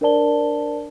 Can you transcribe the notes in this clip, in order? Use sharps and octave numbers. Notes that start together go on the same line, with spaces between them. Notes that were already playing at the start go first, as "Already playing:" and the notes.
D4 A#4 C5 D5 A5 G7